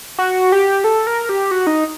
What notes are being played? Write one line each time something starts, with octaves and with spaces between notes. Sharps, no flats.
F#4
G4
A4
A#4
G4
F#4
D#4